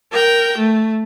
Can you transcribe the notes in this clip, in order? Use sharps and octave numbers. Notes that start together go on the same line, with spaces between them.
A#4 G5
A3